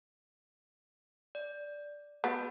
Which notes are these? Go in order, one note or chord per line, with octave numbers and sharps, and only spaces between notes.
D5
B3 F#4 G#4 B4